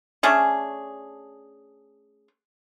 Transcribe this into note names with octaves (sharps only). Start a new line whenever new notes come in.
A3 C#4 D4 G#4